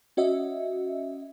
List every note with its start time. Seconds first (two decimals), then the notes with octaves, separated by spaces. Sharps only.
0.17 C#4 F#4 D#5 E5